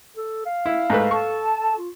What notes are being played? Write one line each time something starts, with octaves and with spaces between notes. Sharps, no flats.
A4
F5
E4
G#2 A3 B4
A4 A5 C#6
F4